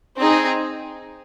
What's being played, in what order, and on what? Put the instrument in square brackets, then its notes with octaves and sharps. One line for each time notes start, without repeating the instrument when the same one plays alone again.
[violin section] C4 D#4 G#4